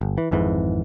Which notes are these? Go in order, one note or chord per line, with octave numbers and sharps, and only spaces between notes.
G1
E3
G#1 F2 G#2 E3